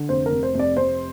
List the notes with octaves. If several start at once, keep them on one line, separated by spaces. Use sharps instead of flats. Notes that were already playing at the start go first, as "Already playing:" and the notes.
Already playing: D3
F1 C5
A#4
F1
C5
F1 D5
F1 C5